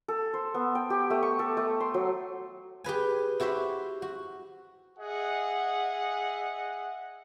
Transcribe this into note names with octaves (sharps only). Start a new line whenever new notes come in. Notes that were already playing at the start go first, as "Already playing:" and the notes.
A4
C5
B3
G5
G4
A3
C#6
A4
A3
C6
F#3
G4 G#4 B4 G#5
E4 F#4 G4 C5 E5
F#4
G#4 D#5 E5 F#5